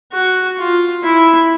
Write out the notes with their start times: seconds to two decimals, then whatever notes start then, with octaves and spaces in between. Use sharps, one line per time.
0.12 F#4
0.58 F4
1.04 E4